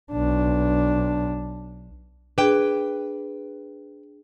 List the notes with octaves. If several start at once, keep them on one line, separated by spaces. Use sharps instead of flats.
B1 D4
D4 G#4 B4 G5